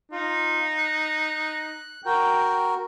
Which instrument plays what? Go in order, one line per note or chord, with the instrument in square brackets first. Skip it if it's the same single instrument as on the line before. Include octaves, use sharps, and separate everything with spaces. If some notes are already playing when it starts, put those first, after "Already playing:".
[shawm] D#4 [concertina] F4
[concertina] F#6
[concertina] F#4 A#4 [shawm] G5